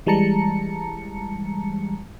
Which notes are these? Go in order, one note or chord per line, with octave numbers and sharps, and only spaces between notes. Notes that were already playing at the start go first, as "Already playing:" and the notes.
E3 G3 G#3 A5 A#5 C#7